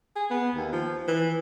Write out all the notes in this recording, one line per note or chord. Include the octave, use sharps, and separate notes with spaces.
G#4
B3
D#2
F3
E3